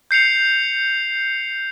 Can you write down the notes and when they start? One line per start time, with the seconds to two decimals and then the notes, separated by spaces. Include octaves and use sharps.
0.11 G6 C7 C#7 F7